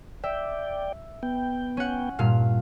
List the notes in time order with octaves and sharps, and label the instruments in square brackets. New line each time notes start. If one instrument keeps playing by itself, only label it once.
[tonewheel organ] D5 G5 [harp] E5
[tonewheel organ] B3 G5
[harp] C#4 F#5
G2 A#2 F5